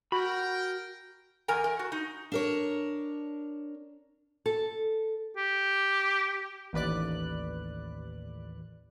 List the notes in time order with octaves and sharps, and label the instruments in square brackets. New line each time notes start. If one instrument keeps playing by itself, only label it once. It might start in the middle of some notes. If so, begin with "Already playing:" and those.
[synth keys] F#4 [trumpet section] A#4 G5 [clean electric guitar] B5
[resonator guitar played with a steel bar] E2 A#4 G#5 A#5
A#4
F#4
D#4
[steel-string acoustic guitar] D4 A#4 C#5
[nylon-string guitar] A4
[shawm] G4
[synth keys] A1 D#2 B4 D5 F#6